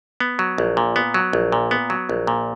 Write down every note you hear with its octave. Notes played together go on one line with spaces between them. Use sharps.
B3
F#3
A#1
A#2
B3
F#3
A#1
A#2
B3
F#3
A#1
A#2